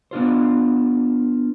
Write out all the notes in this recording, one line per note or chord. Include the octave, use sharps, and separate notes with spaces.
B3 D4 F4 C5